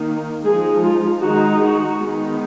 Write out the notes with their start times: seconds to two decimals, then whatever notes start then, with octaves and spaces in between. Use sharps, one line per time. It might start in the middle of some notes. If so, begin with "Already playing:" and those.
Already playing: D#3 A#3 D#4
0.45 F3 G#3 D#4 G#4
0.83 F4
1.21 D#3 G#3 D#4 F#4
1.60 F#4
1.98 D#3 G#3 B3 D#4